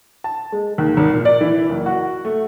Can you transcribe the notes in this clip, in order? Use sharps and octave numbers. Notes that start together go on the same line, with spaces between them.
A5
G#3
D#2
G#1
A#2
D5
E3
F#1
F#4
A3